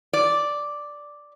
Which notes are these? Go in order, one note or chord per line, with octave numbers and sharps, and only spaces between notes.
D5